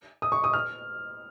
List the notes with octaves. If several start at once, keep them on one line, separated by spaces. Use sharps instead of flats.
D#6
C#6
D#6
F6